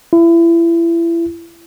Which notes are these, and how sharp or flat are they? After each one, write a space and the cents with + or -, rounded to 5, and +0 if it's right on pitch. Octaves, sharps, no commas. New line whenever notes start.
E4 +30